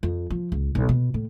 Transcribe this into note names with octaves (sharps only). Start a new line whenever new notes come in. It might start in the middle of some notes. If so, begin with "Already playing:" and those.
F2
F3
C#2
B1
B2
A2